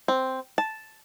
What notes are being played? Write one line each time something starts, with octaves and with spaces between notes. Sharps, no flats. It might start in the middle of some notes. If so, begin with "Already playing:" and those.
C4
A5